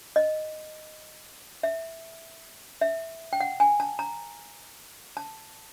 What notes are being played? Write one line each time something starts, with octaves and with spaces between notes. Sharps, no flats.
D#5
E5
E5
G5
F#5
G#5
A5
A#5
A5